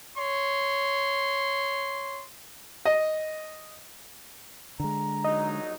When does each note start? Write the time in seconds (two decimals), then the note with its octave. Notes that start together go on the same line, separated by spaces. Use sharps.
0.19 C#5 C6
2.85 D#5
4.80 D3 G#3 A#5
5.25 A#1 F#3 D#4 D#5